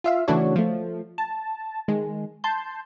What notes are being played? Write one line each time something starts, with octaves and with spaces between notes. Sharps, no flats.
F4 E5 F5
C#3 E3 A3 D4 F#4 C#5
F3 A3
A5
D#3 G#3
A5 C6 G6